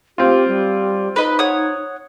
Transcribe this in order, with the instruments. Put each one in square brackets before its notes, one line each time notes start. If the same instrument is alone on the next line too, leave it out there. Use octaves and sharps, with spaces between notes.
[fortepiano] C4 F4 [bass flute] G4
[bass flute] G3
[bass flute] D#4 [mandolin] B4 D#5 B5
[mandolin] C#5 F#5 D#6